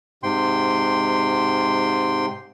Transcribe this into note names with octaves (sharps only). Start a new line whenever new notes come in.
G#2 C3 G5 C6